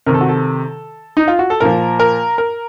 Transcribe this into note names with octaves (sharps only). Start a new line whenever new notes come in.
C3 D#3 A#4
A4
F#4
A4
D#4
F4
F#4
A4
A#2 F3 A#4
A#4
A#4